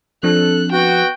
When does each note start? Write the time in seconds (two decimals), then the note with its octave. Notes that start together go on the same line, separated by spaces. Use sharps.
0.23 F3 C4 D4 A4 F#6
0.72 B3 F#4 G5